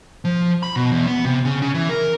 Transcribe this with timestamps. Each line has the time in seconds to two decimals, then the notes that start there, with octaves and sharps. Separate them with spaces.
0.25 F3
0.63 B5
0.76 B2
0.92 E2
1.07 B3
1.25 C3
1.45 C#3
1.62 C#3
1.74 E3
1.89 A#4